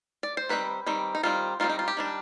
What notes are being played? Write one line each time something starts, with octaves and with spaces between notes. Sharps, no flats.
D5
C5
D#3 G3 C4 B4
D#3 G3 C4
D#4
D#3 G3 C4 F4
D#3 G3 C4 F4
D#4
F4
G4
D#3 G3 D4